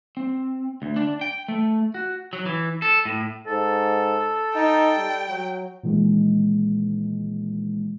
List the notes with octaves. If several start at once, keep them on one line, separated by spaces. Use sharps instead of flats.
C4
D2
D4
G5
A3
F#4
F#3
E3
A4
A2
G#2 A4
D#4 G5
G3
F#3
A#2 D#3 E3 G#3